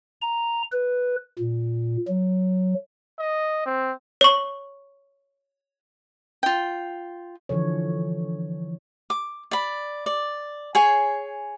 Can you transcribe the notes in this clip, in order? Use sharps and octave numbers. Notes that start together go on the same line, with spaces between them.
A#5
B4
A#2
F#3
D#5
C4
C#5 C#6
F4 G5
D3 E3 F3 A4 C#5
D6
D5 B5
D5
G#4 C#5 G#5 C6